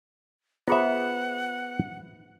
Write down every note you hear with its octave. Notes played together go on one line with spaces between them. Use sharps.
B3 F4 G#4 C5 E5 F#5